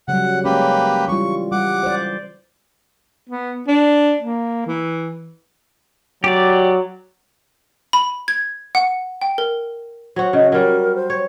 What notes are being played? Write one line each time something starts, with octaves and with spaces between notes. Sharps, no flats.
C#3 F#3 G3 F#5
G#3 A#3 C#4 G4 B4
E3 G3 F4 C#6
G3 F#5 D6
C5 D5
B3
D4
A#3
E3
F#3 G4 D5
B5
G#6
F#5
G5
A#4
F#3 F#4 C5
C#3 D#5
F#3 G3 A#4
C5
C#5